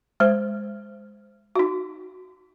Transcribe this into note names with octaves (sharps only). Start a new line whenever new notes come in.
G#3 C5
D#4 F#4